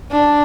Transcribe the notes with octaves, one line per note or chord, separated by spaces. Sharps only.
D4